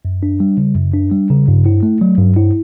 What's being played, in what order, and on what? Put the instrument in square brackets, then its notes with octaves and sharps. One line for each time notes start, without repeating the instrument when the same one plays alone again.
[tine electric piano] F#2
D4
G3
C#3
F#2
D4
G3
C#3
G2
E4
A3
F#3
G2
E4